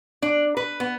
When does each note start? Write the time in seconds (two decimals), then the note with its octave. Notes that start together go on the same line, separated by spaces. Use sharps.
0.22 D4
0.57 B4
0.80 B3